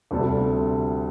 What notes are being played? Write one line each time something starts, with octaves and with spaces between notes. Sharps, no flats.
D2 C3 G3 D4 A4